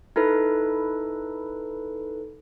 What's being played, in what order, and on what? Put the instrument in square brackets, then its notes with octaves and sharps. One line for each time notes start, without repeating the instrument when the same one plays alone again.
[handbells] D#4 E4 A4 B4